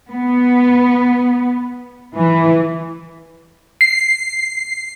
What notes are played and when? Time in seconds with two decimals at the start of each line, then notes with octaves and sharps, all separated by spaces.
0.12 B3
2.17 E3
3.81 C7